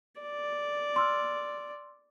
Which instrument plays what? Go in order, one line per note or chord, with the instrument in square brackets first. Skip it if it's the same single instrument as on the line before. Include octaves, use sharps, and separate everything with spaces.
[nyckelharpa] D5
[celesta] C6 E6 F6